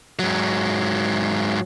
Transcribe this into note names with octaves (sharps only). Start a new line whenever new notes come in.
G#2 F#3